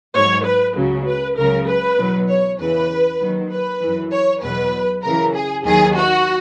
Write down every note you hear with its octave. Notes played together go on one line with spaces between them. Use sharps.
G#2 F#3 C#5
B4
C#2 C#3 F#3
B4
C#2 C#3 F#3 A#4
B4
E2 B2 F#3
C#5
E2 C#3 E3 B4
D#2 D#3 F#3
B4
F#2 E3
C#5
E2 B2 F#3 B4
F#2 C#3 E3 A#4
G#4
D#2 D#3 F#3 G#4
F#4